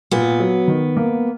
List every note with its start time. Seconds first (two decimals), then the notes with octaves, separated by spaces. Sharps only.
0.11 A#2 B3
0.40 F#3
0.68 D#3
0.97 A#3